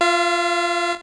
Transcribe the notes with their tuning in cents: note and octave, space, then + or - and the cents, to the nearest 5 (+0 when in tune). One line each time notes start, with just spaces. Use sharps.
F4 -5 F5 -45